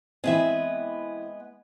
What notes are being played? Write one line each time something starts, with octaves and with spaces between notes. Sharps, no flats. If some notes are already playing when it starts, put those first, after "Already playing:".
E3 G#3 B3 C4 E5